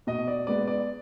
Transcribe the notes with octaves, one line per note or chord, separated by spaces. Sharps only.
B2 D#5
D5
G#3 B3 D5
D5